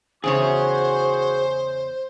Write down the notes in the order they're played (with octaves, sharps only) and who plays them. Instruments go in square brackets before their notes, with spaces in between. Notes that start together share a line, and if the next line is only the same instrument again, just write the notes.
[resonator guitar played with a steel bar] E2 C#3 C#5 [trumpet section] F#4 C#6 [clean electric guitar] G#4 [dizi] C5